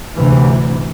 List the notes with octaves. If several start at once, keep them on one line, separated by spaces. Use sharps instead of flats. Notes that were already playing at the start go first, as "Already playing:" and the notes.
D2 G#2 C3 E3